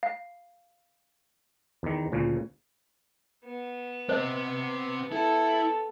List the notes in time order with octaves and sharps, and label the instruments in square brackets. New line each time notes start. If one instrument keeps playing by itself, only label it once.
[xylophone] F5
[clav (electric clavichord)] E2 D#3
D2 A#2 C#3
[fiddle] B3
[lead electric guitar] C4 G4 [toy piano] C5 D#5
[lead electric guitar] E4 [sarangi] A4